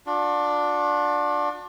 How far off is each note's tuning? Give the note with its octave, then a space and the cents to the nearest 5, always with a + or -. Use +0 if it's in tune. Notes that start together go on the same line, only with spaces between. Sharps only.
D4 +0 F4 +45